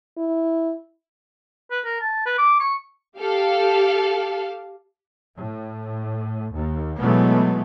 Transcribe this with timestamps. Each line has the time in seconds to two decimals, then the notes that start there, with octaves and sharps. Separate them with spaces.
0.17 E4
1.71 B4
1.85 A#4
2.01 A5
2.26 B4
2.38 D6
2.60 C#6
3.18 G4 A4 F5 A5
5.37 A2
6.53 D#2
7.01 B2 E3 F#3 G#3 A3 B3